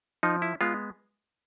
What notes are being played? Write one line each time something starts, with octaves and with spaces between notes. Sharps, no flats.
F3 D#4
E4
G#3 B3 F4